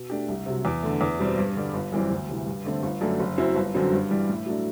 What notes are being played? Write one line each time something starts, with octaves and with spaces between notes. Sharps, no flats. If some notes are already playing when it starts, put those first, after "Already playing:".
Already playing: B2
A3 D4 G4
C2
C3 F#3
E2
D3 A3
E2
B2 G3 C4
G2
D3 G3
G1
F#2 E3 G3 C4
D2
C3 E3
G2
D3 A3 C4
G1
F#2 D3 A3 D4
F#1
F#2 F#3 C4 E4
G1
F#2 D3 F#3 C4
G2
E3 G3
A2
F#3 A3 D4